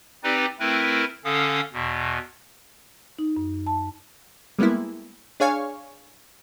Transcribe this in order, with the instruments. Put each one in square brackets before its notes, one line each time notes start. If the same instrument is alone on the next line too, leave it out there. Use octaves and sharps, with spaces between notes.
[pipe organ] C4 D#4 G4 B4 D5
A3 C4 E4 A#4 B4
D3 C#4 A4 F5 D#6
E2 B2
[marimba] D#4
F#2
A5
[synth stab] G3 G#3 A#3 B3 E4
D4 G#4 C#5 F5 G#5 C#6